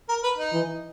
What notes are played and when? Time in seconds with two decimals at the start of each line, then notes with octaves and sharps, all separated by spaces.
0.09 A#4
0.24 B4
0.38 D#4
0.53 E3